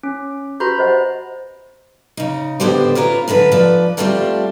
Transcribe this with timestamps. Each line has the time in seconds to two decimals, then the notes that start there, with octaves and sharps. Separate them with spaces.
0.03 C#4
0.60 F#4 G4 B4 A#5 B5 G6
0.78 C5 D#5 F#5
2.17 C#3 D#4
2.60 A2 D3 B3 G4 A4 C5
2.95 C#4 F4 A#4 B4 C#5
3.28 F#2 D3 A4 B4
3.52 F3 B4 D5
3.97 G3 A3 C4 F4 F#4 A4